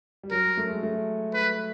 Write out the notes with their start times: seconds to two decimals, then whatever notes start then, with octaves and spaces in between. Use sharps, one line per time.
0.23 G3
0.31 F#3 A#4
0.57 A3
0.69 G#3
0.83 A3
1.34 B4